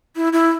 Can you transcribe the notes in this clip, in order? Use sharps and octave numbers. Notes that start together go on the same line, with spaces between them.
E4
E4